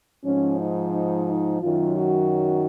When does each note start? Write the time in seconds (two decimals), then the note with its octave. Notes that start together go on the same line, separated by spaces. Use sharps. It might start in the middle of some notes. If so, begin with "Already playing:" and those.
0.24 G#2 F3 C#4
0.59 D#4
0.93 D#4
1.27 D#4
1.62 F#2 D#3 F#3 F4
1.96 F#4